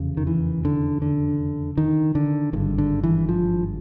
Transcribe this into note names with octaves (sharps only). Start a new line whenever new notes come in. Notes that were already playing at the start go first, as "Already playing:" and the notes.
Already playing: F1 E2 C#3
D#3
E3
D3
D3
D#3
D3
G#1 G2 D3 D#3
D3
E3
F3